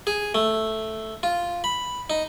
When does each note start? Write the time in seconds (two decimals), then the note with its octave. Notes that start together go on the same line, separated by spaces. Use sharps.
0.07 G#4
0.35 A3
1.23 F4
1.64 B5
2.10 D#4